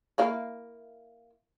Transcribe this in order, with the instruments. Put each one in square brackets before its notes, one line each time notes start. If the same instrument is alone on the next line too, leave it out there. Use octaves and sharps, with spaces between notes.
[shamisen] A#3 E4 F5